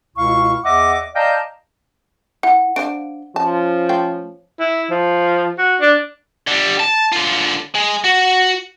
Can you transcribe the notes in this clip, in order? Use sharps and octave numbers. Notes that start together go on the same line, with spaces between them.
C#2 B2 E4 F5 C#6
E2 D#5 E5 F#5 D6
D5 D#5 F5 G5 A5 A#5
E4 F#5
D4 C5 F5 D7
F3 C#4 A5
A3 F5 G5
E4
F3
F#4
D4
D3 G3
A5
D3 F4
G#3
F#4